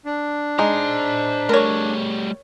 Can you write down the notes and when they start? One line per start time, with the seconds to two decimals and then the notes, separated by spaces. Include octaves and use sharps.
0.05 D4
0.59 G#3 D#4 C5 A#5
1.49 G3 A3 A#4 C#5